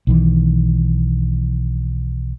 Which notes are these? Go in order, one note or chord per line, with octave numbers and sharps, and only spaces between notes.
B1 D#3 E3